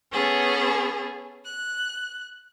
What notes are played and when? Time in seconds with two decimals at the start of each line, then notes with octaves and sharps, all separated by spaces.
0.12 B3 C#4 G#4 A4
1.45 F#6